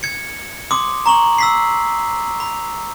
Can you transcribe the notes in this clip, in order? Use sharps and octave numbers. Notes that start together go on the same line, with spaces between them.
G#6 C#7
C6 D6 D#6
A#5 C#6 F#7
E6 B6 C7
B5